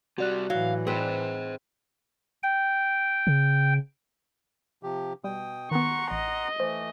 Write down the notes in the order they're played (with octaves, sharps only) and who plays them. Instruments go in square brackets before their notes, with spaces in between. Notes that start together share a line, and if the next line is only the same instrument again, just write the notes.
[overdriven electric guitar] C3 G3 [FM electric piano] F#4 D5 F#6
[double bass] A2 E3 [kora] F#3 [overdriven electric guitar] F5
[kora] C4 B4 [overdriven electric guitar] G#4 C5
[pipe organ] G5
[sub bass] C#3
[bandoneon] C3 F3 G4
[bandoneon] B2 G5 D#6 [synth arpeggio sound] G3
[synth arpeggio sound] D#3 B3 [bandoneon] F#5 A#5 C6 [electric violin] C#6
[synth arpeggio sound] A1 [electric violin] D#5
[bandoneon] E3 A3 [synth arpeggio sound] C5